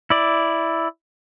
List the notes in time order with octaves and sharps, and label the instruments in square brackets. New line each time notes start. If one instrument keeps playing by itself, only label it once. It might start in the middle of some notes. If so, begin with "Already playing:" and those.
[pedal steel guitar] E4 D5